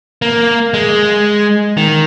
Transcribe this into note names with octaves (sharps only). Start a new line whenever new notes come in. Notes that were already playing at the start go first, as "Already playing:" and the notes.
A#3
G#3
D#3